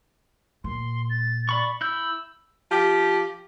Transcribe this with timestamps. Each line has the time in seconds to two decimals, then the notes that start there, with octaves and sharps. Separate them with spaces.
0.64 A#2 C6
1.10 A6
1.49 D5 B5 C#6
1.81 E4 E6 G6
2.70 F3 G4